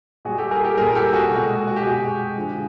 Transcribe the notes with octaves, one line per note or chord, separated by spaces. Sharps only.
A#2 G3 F#4 G#4
G4 A4
G#4 A#4
G4 A4
A#2 G3 G#4 A#4
G4 A4
F#4 G#4
B2 G#3
F#4
G4
B2 G#3 F#4 G#4
D3 F3 G#3